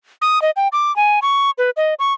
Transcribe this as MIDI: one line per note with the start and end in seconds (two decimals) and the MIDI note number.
0.22 0.41 87
0.42 0.51 75
0.56 0.68 79
0.72 0.94 86
0.96 1.19 80
1.22 1.51 85
1.58 1.70 71
1.77 1.94 75
1.99 2.13 85